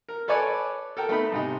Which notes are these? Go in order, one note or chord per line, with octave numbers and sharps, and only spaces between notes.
A#4
A4 B4 C#5 D5 G#5
A4 A#4 G5
A3 B3 D#4 B5
G#2 C3 D#4